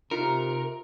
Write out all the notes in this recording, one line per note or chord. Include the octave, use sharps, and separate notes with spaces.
C3 D#4 F4 A#4 C#7